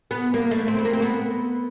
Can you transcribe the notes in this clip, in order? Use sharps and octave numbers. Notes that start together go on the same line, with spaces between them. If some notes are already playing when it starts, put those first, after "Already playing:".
B3
A#3
A3
C4
B3
A#3
C4
B3